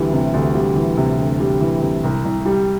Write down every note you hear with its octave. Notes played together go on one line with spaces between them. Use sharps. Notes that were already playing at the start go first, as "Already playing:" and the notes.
Already playing: D2 E3 G3
C3
D2
G3
E3
C3
D2
G3
E3
C3
C2
C2
G3